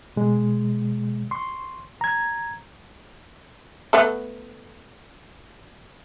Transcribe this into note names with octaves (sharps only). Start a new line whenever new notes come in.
B2 G#3
C6 C#6
A#5 G#6
A3 B3 A4